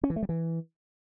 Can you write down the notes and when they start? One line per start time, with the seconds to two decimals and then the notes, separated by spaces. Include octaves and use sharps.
0.03 C#4
0.10 E3
0.16 A3
0.23 G3
0.29 E3